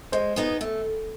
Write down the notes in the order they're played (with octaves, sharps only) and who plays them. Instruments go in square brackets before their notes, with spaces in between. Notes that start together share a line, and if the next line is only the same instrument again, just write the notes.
[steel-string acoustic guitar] G#3 [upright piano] C5
[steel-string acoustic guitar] B3 D#4 G#4
A3